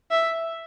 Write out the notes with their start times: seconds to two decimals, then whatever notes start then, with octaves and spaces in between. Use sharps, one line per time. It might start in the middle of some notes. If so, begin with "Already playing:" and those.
0.11 E5